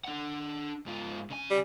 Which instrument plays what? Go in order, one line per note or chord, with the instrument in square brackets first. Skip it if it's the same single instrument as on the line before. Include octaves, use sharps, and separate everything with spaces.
[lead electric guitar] D4 F#5
G#2 F4
C#3 G#5
[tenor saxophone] G3